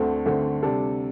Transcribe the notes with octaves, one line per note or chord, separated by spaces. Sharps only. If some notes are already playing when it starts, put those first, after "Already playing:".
Already playing: D2 D3 A3 C4
D2 D3 A3 C4
C3 G3 D4 A4